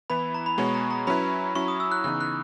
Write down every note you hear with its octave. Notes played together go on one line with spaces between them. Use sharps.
E3 B3 E4 B4 B5
A#5
B5
B2 G#3 B3 F#4 C#5 C#6
A#5
A#5
F#3 C#4 E4 B4 B5
F#3 C#4 E4 C#6
D#6
E6
F#6
C#3 E3 B3 D#4 F#6
F#6